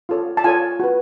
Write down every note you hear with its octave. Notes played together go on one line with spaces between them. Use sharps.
F4 A4 C#5
A5
F4 A4 C#5 G#5
F#4 B4